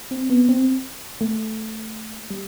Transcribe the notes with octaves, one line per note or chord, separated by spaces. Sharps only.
C4
B3
C4
A3
G3